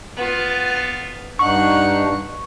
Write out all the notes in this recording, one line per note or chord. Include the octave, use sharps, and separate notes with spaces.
B3 F4
G2 D4 D#4 F#5 C#6